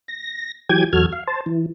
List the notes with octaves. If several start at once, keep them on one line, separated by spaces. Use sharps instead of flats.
A#6
E3 F#3 G4 G5 G#5 G#6
E2 F#3 F#4 A4 F6 G#6
F5
C5 A5
E3